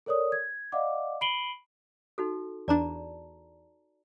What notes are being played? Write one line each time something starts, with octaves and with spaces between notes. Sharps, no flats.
A4 A#4 C#5 D5 D#6
G#6
D5 D#5 F5 F#5 D6
B5 C7 D7 D#7 F#7 G7
D#4 F#4 A4
E2 D4 D5 A5 A#5